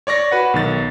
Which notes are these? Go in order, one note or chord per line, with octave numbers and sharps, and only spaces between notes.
C#5 D5 C#6 A#6
F#4 B4 F#5
B1 D#3 A6